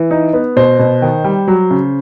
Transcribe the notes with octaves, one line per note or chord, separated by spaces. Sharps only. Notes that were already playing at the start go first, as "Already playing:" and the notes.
Already playing: E3
D#4
B3
B2 C5
B2
D#3
G3
F#3
C#3